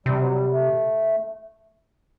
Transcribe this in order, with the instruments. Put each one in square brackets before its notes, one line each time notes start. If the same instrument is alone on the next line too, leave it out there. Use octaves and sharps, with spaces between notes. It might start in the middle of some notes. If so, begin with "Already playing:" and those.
[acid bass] C3 [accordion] G3
[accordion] F#3
G3
A3